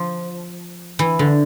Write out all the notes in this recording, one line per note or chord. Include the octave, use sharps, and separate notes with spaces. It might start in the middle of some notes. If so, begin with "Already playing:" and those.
Already playing: F3
E3
D3